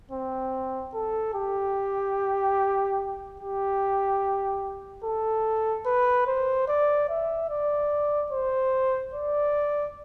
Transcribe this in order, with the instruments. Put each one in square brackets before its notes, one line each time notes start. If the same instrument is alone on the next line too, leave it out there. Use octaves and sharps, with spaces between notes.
[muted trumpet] C4
A4
G4
G4
A4
B4
C5
D5
E5
D5
C5
D5